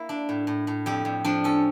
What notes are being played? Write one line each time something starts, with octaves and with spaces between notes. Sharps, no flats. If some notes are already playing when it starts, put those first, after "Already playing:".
Already playing: A#3 E4
D4
A2
A2
A2
F2 G4
F2
F3 D4
C#4 A4